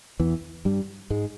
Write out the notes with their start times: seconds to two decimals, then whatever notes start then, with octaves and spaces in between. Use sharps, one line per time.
0.20 E2 E3
0.65 G2 G3
1.10 G#2 G#3